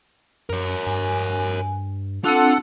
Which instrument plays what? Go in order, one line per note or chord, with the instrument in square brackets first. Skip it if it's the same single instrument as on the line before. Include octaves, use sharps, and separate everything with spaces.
[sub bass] F#2 [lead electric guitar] A#4 C#5
[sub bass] G2 [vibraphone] G#5
[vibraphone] C4 D4 [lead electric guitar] F4 [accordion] A4 F#5